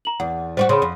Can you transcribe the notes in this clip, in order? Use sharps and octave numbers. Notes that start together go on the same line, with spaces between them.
A#5 F#7
E2 F#5
G3 F4 F#4 C5
C#3 B5 C6
F2